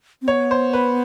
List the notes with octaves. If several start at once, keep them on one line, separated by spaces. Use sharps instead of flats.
C4
B3 C#5
C5
B4